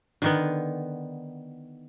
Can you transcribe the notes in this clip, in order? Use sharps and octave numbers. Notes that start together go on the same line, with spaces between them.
D3 D#3 B3